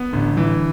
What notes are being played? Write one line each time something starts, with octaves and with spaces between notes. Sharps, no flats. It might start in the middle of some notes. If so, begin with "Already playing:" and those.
Already playing: B3
A1 D3
E3